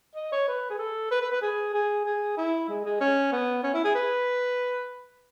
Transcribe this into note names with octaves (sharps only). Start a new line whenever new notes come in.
D#5
C#5
B4
G#4
A4
B4
B4
B4
G#4
G#4
G#4
E4
G#3
G#3
C#4
B3
C#4
E4
G#4
B4